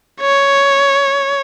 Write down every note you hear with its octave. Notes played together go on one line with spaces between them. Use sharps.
C#5